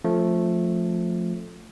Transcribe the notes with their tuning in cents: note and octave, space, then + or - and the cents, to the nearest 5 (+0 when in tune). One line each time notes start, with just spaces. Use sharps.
F3 +10 A3 +0 C#4 -45